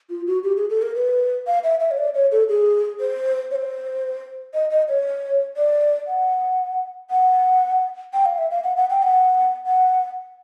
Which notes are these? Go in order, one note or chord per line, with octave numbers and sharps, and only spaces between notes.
F4
F#4
G4
G#4
A4
A#4
B4
F5
E5
E5
C#5
D5
C#5
A4
G#4
C5
C#5
C5
D#5
D#5
C#5
D5
F#5
F#5
G5
F5
E5
F5
F#5
F#5
G5
F#5
F#5